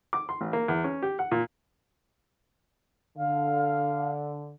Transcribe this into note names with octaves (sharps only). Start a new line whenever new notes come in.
D6
C6
A1
A#3
E2
C#4
G4
F#5
A#2
D3 F5